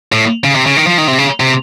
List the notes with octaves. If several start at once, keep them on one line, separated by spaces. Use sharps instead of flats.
A2
C#3
C3
C#3
D#3
F3
D#3
C3
C#3
C3